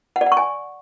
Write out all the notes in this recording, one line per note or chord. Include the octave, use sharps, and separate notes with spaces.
F#5
D5
F#5
C#6
G#5